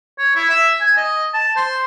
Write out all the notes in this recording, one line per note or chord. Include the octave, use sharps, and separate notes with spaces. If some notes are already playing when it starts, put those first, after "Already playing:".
C#5
E4
E5
G#5
D#5
A5
C5